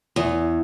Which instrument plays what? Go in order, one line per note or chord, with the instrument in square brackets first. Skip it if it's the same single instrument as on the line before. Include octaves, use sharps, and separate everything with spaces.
[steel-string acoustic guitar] E2